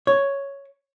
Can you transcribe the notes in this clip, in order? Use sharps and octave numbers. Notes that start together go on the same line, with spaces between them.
C#5